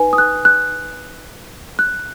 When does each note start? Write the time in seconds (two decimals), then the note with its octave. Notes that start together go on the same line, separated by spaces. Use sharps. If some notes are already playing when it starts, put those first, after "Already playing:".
Already playing: D#4 B4 G#5
0.13 D#6
0.18 F#6
0.45 F#6
1.79 F#6